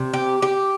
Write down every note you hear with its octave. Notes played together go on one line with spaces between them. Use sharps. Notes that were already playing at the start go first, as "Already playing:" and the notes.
Already playing: C3
G4
G4